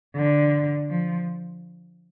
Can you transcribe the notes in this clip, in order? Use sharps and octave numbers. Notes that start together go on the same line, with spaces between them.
D3
F3